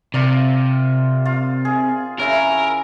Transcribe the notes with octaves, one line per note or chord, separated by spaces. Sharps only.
C3 F4 A#4 D5
F4
G#4
C#3 E4 A#4